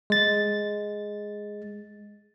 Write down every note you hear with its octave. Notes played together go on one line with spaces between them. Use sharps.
G#3 A6